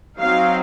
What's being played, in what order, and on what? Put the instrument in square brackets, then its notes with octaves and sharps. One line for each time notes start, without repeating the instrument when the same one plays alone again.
[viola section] F#3 C4 D#4 F5